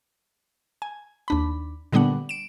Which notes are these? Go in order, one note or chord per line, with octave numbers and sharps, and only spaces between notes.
G#5
D#2 D4 B5
A#2 D3 G3 B3 D4 F#5
D7 E7